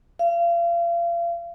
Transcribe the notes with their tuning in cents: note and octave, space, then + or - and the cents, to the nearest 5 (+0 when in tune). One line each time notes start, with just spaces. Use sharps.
F5 -35